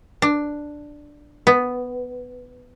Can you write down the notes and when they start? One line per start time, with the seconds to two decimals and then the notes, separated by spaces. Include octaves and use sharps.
0.22 D4
1.47 B3